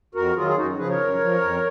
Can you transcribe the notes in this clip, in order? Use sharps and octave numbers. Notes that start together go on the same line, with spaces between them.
F2 F#4 A#4
D#3 F#3 F4 G#4
G#4
F#2 D#4 F#4
C#3 F3 G#4 B4
A#4 C#5
F#2
F3
F2